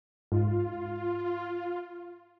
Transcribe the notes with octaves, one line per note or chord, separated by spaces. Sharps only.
G#2 F4